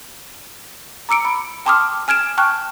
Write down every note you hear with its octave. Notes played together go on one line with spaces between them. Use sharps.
A#5 D6 E6 C#7 D7
B5
G5 A5 C6 D6 D#6 F6
G#5 F6 G#6 D7 E7
G5 A5 C#6 F6 F#6